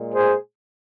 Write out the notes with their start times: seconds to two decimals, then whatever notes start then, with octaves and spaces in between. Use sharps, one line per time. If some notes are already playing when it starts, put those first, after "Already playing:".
Already playing: A#2 G#3
0.14 G#4 C5